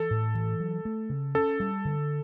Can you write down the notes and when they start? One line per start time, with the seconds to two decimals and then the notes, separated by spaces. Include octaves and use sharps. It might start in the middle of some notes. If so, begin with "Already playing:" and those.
Already playing: E3 A4
0.10 A2
0.35 E3
0.60 F#3
0.85 A3
1.10 C#3
1.35 C#4 A4
1.60 G3
1.85 D3